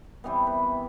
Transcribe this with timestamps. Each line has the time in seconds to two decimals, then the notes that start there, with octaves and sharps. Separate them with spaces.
0.24 C3 E3 G3 B3
0.47 B4